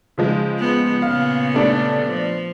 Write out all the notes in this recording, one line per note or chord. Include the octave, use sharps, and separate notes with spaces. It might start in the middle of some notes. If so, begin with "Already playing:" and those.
C#3 F3 G#3
B3
A#2 C#3 B3 F5
G3 A3 D4
F3